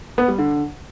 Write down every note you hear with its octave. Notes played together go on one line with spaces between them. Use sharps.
B3
G3
D3